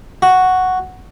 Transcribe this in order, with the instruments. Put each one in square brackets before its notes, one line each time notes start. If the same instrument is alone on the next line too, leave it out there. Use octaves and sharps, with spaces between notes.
[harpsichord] F#4